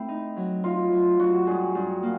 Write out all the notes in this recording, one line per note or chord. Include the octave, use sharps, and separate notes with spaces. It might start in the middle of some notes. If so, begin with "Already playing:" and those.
Already playing: A3 C4 E4
D#4
F#3
D#4 F4
F#3
F#3 F#4
G2 G#4
G2
A#3